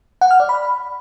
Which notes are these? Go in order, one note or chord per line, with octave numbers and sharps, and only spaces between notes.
F#5
F6
D5
B5